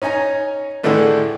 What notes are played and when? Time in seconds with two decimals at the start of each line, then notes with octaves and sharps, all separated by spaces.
0.02 C#4 D#4 C#5 G#5 A#5
0.83 A2 D3 E3 G#3 A3 D4